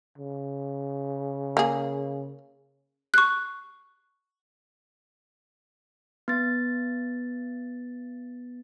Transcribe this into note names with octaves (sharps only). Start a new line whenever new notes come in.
C#3
A#3 G#4
C#6 F#6
B3 A6